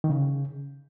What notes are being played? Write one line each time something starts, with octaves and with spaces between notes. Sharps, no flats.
D#3
C#3